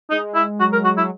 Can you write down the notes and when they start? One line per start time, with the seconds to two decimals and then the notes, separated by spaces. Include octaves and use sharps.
0.11 G#3 D#4
0.35 E4
0.60 F#3 F#4
0.73 A#4
0.84 F#3 F#4
0.97 F#3 E4